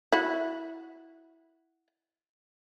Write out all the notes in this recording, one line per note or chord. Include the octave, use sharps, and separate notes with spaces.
E4 F#4